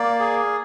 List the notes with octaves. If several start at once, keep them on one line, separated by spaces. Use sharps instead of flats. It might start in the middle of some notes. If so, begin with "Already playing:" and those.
Already playing: A#3 D5
G#4